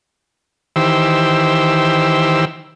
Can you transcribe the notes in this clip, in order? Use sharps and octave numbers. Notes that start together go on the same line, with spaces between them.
D#3 E3 G4 C5 E6